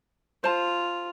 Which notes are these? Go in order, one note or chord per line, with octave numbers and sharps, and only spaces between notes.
F4 C5 A5